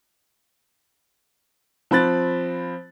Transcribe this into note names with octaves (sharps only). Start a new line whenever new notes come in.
F3 C4 B5 F#6 A6